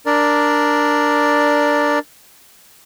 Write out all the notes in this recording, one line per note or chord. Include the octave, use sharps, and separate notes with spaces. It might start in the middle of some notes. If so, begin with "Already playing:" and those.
D4 A#4 D5